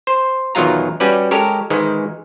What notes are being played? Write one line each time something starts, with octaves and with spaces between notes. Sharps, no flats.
C5
E2 B2 D#3 F#3 F4 A#5
G3 C#4 F#4 B4 D5
G#3 G4 A4 A#4 C#5
G#2 D#3 E3 G#3